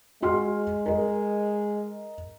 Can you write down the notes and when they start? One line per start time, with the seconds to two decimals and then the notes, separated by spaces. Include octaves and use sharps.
0.22 G#3 F#4 C6 F6
0.86 A#4 D#5